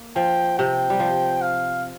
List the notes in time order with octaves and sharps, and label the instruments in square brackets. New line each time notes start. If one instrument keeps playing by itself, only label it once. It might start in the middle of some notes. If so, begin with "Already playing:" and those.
Already playing: [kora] A#3
[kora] F3 [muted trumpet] G5
[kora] C3 [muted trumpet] G5
[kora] G3
F3
[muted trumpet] F5